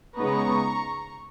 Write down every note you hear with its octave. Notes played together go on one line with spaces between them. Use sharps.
C#3 G#3 B3 D#4 A#5 C#6